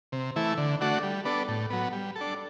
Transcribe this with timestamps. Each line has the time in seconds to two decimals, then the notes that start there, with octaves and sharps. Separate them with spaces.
0.12 C3
0.36 E3 A3 E4
0.58 D3
0.81 A3 D4 F#4
1.03 G3
1.25 B3 D4 A4
1.48 A2
1.70 F#3 B3
1.93 G3
2.16 A4
2.21 D4